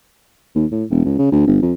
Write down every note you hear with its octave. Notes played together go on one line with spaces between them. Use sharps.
D#2
A2
E1
C#2
C#3
D2
G1
F2